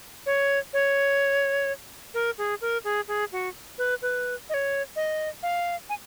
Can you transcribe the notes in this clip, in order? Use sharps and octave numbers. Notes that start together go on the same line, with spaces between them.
C#5
C#5
A#4
G#4
A#4
G#4
G#4
F#4
B4
B4
D#5
C#5
D#5
F5
G#5